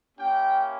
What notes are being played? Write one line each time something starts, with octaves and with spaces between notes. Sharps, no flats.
A#3 C#4 E4 G4 G5